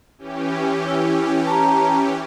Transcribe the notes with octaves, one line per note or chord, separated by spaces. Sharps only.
E3 C#4 G4
E4
A5 A#5